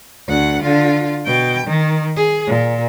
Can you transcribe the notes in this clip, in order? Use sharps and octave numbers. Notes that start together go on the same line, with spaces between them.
D2 F#5
D3 F4
B2 G5
D#3
G#4
A#2